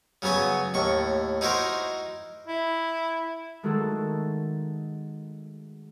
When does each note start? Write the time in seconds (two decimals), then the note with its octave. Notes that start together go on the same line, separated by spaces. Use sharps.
0.22 C#3 F#3 B3 F#4 G#5
0.74 D#2 A2 C#6
1.41 D#4 E4 F#4 A#4 C5
2.47 E4
3.63 D#3 G#3 A3 F#4 A4 C5